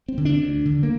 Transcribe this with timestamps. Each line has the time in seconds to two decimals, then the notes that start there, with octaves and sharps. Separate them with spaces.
0.08 C4
0.17 D3
0.25 D4
0.41 D2
0.65 D3
0.83 A#3